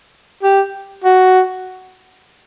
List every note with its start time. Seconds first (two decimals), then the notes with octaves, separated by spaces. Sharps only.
0.43 G4
1.04 F#4